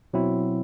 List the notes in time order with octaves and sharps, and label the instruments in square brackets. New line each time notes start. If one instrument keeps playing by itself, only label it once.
[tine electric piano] B2 F#3 C4 E4